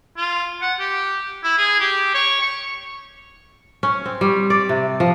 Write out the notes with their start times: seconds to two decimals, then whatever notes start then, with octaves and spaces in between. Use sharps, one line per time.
0.17 F4
0.62 F#5
0.80 G4
1.44 E4
1.58 G#4
1.80 G4
2.14 C#5
2.41 C#6
3.83 C#4
4.05 C4
4.21 G3
4.50 D5
4.69 C3
5.00 F3